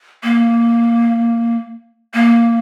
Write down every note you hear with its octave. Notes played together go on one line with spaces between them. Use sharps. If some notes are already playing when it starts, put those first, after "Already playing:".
A#3
A#3